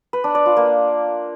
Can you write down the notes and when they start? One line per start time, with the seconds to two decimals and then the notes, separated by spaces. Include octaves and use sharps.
0.13 B4
0.24 D4
0.35 D5
0.46 F4
0.57 A#3